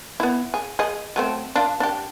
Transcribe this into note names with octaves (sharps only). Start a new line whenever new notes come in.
B3 E4
G#4
G#4 D#5
F#3 A3 C4
D4 F4
D4 G4